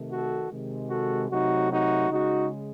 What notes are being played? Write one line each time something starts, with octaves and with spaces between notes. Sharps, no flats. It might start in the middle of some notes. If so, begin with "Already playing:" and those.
Already playing: C3 D#3 A3
F#4 A4
C3 D#3 G#3
F#4 A4
C3 F#3 A3 D#4 F#4
D#4 F#4
C#3 G#3 D#4 F#4